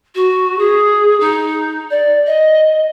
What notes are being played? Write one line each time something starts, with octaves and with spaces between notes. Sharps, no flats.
F#4
G#4
D#4
D5
D#5